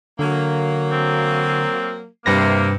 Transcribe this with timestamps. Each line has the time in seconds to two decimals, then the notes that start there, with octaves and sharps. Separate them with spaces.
0.19 D3 F#3 A#3
0.92 C4
2.26 G2 C3 A#3 B4 A#6